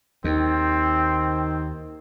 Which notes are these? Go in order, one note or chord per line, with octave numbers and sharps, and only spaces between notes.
D#2 D#3 C4